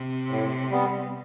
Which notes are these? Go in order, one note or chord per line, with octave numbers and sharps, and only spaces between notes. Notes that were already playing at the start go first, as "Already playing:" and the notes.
Already playing: C3
A2
G3 B3